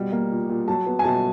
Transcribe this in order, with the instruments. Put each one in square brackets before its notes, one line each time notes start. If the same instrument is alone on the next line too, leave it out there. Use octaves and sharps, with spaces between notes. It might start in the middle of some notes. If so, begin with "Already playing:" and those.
Already playing: [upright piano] B2 G3
A#3
A#2
A#2
F#3 A5
B3
G#5
B2 A5